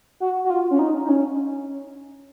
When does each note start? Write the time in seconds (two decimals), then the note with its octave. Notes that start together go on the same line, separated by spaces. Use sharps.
0.20 F#4
0.45 F#4
0.50 F4
0.71 C#4
0.79 D#4
1.05 D#4
1.09 C#4